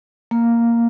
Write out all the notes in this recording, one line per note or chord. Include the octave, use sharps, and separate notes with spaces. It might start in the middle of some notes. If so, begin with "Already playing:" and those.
A#3